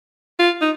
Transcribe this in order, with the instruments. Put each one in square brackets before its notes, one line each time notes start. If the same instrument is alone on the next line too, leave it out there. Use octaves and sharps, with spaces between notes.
[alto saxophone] F4
D#4